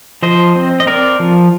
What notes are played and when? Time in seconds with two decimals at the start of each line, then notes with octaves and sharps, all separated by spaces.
0.23 F3 C5 D#5
0.55 C4
0.80 D#5
0.87 C4 A#4 D5
1.20 F3